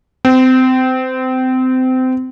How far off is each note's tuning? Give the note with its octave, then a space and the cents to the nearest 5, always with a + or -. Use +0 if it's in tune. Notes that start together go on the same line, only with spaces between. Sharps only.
C4 -25